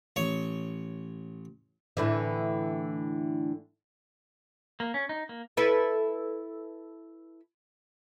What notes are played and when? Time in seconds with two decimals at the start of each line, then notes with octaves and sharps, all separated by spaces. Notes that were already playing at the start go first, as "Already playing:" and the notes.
0.16 A1 C#5 C#6
1.97 A2 D3 E3
4.80 A#3
4.94 C#4
5.09 D#4
5.29 A#3
5.57 E4 A4 B4